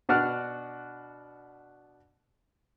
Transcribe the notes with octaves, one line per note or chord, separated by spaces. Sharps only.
B2 D4 F#4 D5 F#5 F6